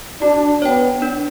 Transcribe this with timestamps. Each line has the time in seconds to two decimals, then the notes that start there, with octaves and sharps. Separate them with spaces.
0.22 D4 F#4
0.62 B3 C#5 G5
1.02 D4